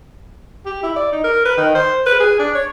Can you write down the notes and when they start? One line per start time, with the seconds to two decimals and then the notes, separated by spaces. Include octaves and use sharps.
0.66 G4
0.83 E4
0.96 D5
1.12 D#4
1.24 A#4
1.45 B4
1.57 D#3
1.75 C5
2.06 B4
2.20 G#4
2.39 D4
2.55 C#5